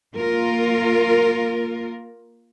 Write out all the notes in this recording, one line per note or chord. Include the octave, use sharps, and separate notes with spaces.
A#3 F4 A#4